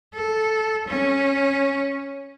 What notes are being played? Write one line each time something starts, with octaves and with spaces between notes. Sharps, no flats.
A4
C#4